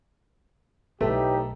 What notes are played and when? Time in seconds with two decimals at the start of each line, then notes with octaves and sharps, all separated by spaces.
1.01 B1 A2 A3 D#4 G4 B4